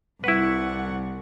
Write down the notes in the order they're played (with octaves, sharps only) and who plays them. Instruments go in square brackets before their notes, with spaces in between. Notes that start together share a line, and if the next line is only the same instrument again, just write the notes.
[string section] C2 [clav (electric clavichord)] E4 B4 [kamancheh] F#5 C#6